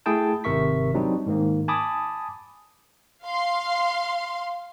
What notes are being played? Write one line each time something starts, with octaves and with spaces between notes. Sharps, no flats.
A3 E4 G#4 G5 A5
G#1 C3 A#4 E5 C#6 B6
F#3 G3 C4 D4 D#4
G#2 D#3 A#3
G#5 A5 B5 D6 D#6
F5 C6